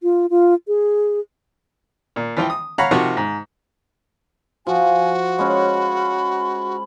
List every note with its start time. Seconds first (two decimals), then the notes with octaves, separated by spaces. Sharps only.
0.03 F4
0.30 F4
0.68 G#4
2.16 A#2
2.37 E3 F3 G5
2.50 D#6
2.78 C#5 F5 F#5 A#5 B5
2.91 C3 D#3 F3 F#4 C#6
3.17 G#2
4.67 F3 F#4 G#5
5.39 G#3 C#4 B5